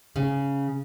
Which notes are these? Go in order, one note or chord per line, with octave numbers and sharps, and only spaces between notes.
C#3